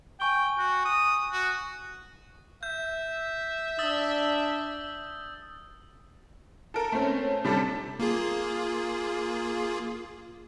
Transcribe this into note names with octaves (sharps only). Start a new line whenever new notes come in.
G5 G#5 C#6 G7
F#4
D#6
F#4
E5 G6
D4 D#6 E6 A6
A4 A#4
A3 C4 C#4
C3 G3 D4 A4
A#3 F4 G#4